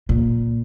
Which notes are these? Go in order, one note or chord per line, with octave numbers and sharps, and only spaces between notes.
A#2